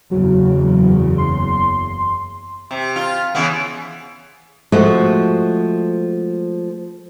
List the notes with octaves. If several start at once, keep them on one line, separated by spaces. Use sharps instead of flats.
F#1 E2 C#3 F#3
C6
C3
F4
C#3 E3 B3
F3 G#3 A3 F#4